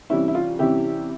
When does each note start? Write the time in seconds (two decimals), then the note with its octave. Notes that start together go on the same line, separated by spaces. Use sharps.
0.10 C3 E3 G3 C#4 E4
0.28 E4
0.35 F4
0.59 C3 E3 G3 C#4 E4 G4